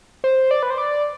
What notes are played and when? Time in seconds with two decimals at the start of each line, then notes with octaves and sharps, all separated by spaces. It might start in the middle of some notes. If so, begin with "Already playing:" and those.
0.24 C5
0.51 D5
0.63 B4
0.70 C5
0.78 D5